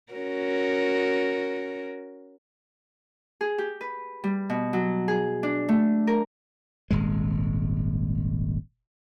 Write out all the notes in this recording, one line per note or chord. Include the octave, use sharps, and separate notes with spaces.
C#4 F#4 A#4
G#4
G4
B4
G3
B2
F#3
G#4
D4
A3
A#4
D#1 G#1 G#3